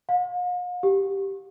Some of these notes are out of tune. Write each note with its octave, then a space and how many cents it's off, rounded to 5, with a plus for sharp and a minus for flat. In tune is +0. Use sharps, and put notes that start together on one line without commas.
F5 +45
G4 -5